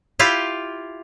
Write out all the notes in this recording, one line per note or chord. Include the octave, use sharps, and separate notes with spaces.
E4 F4 G4 F5